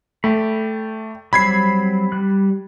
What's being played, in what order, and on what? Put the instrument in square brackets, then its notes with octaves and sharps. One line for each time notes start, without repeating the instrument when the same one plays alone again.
[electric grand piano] A3 [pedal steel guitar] D5 G5 B5
[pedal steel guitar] F#3 G3 C4 [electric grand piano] B5 G#6 C7
[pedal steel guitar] G3 F#6